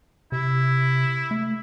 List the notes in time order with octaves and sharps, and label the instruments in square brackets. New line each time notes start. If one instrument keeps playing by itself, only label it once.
[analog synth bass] C3 [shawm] E4
[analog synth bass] A3